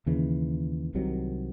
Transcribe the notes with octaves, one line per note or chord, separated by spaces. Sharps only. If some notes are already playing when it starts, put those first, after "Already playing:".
D#2 C#3 E3
C2 C3 D#3 F#3